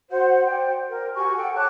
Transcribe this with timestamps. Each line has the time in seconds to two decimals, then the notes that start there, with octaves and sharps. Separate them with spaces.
0.10 F#4 C5 F#5
0.46 C5 D5 G5
0.88 A#4
1.16 F#4 G4 G#5 C#6
1.35 A4 F#5 G5
1.55 C#5 A5 D6 F#6